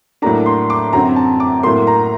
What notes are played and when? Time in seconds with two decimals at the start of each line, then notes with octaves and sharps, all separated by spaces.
0.22 A2 F#3 A#3 D4 A#5
0.46 C6
0.70 D6
0.93 F#2 D3 F#3 C4 A#5
1.16 A5
1.40 D6
1.63 A2 F#3 A#3 C6
1.87 A#5